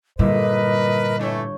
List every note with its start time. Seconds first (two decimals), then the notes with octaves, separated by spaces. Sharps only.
0.19 G1 A#2 G3 E4 A#4 B4 D#5
1.19 E3 A3 D4 C#5 G6